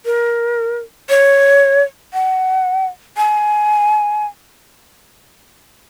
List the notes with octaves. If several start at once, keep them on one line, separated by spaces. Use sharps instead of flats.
A#4
C#5
F#5
G#5